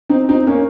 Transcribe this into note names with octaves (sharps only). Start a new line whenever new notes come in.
C4 D#4
C4 D#4
A#3 C#4